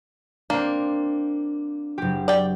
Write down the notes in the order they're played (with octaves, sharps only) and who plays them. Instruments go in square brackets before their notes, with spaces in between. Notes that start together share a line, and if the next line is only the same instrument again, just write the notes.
[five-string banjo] A#3 [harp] C4 D4
[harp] F#1 G4
[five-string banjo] D5 G5